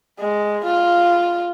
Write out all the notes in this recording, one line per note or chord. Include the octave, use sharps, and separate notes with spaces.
G#3
F4